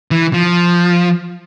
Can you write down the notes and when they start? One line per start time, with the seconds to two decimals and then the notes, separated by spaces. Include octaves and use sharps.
0.11 E3
0.33 F3